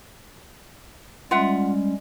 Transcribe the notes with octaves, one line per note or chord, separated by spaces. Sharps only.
G3 G#3 C#4 F4 E5 F#5